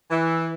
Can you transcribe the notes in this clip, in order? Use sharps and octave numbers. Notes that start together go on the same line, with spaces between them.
E3